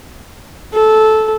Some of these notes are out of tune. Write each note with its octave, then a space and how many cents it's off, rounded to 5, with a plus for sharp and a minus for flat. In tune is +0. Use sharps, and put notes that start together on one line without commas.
A4 -15